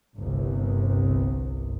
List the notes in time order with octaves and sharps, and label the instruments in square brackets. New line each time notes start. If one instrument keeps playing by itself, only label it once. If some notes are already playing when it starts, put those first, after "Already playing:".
[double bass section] G1 C2